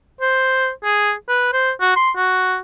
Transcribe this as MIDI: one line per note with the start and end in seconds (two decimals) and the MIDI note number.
0.21 0.70 72
0.84 1.13 68
1.29 1.50 71
1.53 1.71 72
1.81 1.95 66
1.96 2.11 84
2.16 2.58 66